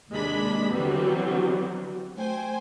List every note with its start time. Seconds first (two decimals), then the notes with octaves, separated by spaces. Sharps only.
0.11 D#2 C3 G#3 D4 B5 B6
0.73 D3 E3 F#3 G3 B3 C4
2.16 A3 C5 G5 G#5